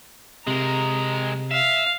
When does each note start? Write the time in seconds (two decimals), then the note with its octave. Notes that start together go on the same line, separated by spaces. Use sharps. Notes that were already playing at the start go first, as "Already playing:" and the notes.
0.47 C3 G#3 A#4 A#5
1.51 E5 F5